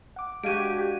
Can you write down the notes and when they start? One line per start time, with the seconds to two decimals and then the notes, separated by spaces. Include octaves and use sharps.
0.16 F#5 D6
0.44 G#3 D4 F#4 G4 F5 G#6 D7 D#7